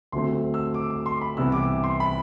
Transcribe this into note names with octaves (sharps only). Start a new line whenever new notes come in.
D2 D3 F#3 A3 C4 C6
E6
D6
D6
C6
B5
C2 C3 E3 B3 E6
D6
C6
B5